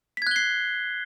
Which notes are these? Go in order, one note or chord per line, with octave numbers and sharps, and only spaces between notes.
F#6 G#6 B6 C7 G7